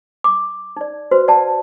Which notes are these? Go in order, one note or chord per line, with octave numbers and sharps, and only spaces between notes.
D6
D#4 D5
F#4 B4 C5
D5 F#5 A5